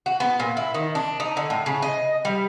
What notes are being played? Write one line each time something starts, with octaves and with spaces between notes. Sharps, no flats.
F#4
B3
A#2
E4
D#3
D4
D#4
D3
A2
C#3
D#5
G3